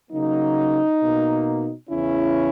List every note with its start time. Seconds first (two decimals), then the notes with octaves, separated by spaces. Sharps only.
0.11 C#3 F#3 A#3 D#4
1.00 B2 A#3
1.89 E2 C#3 E3 C#4 E4